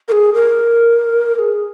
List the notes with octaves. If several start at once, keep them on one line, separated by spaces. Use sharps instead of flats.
A#4
G#4
A#4
A#4
G#4